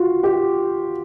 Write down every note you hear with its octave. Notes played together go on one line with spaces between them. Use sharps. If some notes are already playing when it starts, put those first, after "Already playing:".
Already playing: F4 F#4
G4